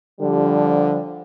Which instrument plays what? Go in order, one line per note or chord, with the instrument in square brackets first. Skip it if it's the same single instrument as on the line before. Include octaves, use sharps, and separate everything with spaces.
[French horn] D3 [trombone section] F3 G3